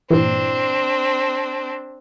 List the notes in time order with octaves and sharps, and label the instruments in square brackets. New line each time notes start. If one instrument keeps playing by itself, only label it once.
[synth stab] G2 A#2 E3 [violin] C4 D4